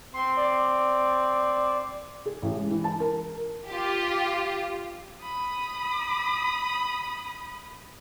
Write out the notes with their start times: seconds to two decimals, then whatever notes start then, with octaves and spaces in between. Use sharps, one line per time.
0.14 C4 C6
0.37 D5
2.26 G#4
2.42 A1
2.56 G#3
2.71 E3
2.84 A5
3.00 A#4
3.68 F4 G4
5.22 B5 D#6